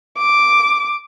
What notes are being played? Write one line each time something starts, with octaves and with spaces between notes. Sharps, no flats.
D6